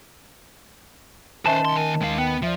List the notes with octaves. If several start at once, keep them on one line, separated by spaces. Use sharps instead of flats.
D#3 C#4 B4 C5 E5 G#5 A5
C2 C6
D#2 A#4 G#5
D#2 G#3 F5
B3 G5
F3 D5 E5